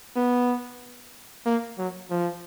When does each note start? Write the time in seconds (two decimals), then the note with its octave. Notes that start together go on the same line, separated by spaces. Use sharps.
0.16 B3
1.46 A#3
1.78 F#3
2.10 F3